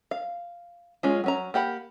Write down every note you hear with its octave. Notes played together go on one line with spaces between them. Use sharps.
F5
G#3 C#4 F4
F#3 C#4 A#5
A#3 G4 F#5 B5